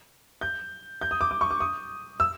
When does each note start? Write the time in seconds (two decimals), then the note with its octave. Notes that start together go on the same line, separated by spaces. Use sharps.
0.41 G6
1.01 G6
1.11 D#6
1.21 D6
1.31 D6
1.41 C#6
1.51 D6
1.60 D#6
2.20 E6